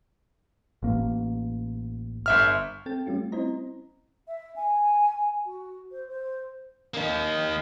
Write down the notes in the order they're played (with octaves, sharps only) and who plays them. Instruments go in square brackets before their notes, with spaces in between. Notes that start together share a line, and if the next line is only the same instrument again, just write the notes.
[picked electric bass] A1 A#3
[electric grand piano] G1 E5 F6
[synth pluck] C4 A4 G5 A6
G3 A3 C#4 F4 F#4
C4 C#4 E4 C5 D#5 A#5
[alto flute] E5
G#5
F#4
C5
C5
[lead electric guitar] A#3 D#4